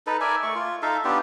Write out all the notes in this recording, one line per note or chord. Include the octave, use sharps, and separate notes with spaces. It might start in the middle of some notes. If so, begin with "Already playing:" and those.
D#4 A4 B4
A#4 D5 E5 G#5
A3 C#6
F4
D#4 A4 E5 F5
B3 D4 F4 G4